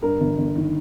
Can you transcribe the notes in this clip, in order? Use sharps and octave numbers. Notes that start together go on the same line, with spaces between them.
G2 A#4
G1
G1
D#3